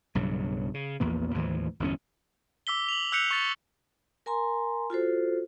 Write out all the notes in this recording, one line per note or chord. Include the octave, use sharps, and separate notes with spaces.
B1 G2 C#3 F#3
C#3
A#1 E2 A#2 B3
D#2 A2 E3 F3
G1 E2 C4 C#4
D6 E6 B6 G7
F7 F#7
E6 F#6 G6 B6 C#7 F7
C#6 A6
A#4 G#5 A#5 C6
F4 F#4 A4 C5